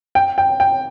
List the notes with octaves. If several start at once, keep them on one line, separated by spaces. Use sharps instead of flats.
G5
G5
G5